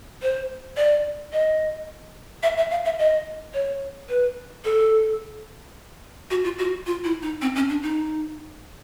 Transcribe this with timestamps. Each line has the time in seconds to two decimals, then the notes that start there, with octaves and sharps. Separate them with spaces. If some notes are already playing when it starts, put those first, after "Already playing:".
0.22 C5
0.77 D5
1.33 D#5
2.43 E5
2.57 E5
2.71 F5
2.85 E5
2.99 D#5
3.54 C#5
4.09 B4
4.65 A4
6.31 F#4
6.44 F4
6.58 F#4
6.86 F4
7.04 E4
7.22 D#4
7.42 C4
7.56 C#4
7.69 D4
7.83 D#4